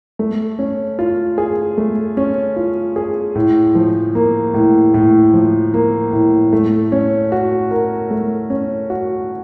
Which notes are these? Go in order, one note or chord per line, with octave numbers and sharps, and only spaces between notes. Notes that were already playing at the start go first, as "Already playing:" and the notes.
A3
C#4
F4
G#4
A3
C#4
F4
G#4
A2
F3
A#3
A2
A2
F3
A#3
A2
A3
C#4
F#4
A#4
A3
C#4
F#4